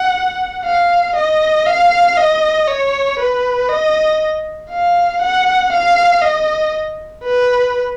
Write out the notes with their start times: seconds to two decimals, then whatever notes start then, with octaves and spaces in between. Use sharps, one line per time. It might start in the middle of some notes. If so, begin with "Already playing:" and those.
Already playing: F#5
0.65 F5
1.15 D#5
1.66 F5
2.17 D#5
2.67 C#5
3.19 B4
3.69 D#5
4.70 F5
5.22 F#5
5.72 F5
6.22 D#5
7.24 B4